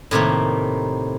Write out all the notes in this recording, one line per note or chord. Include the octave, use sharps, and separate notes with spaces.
A2 C3 D#3 A#3